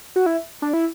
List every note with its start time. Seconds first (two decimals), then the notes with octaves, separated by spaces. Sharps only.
0.16 F#4
0.26 E4
0.62 D4
0.73 E4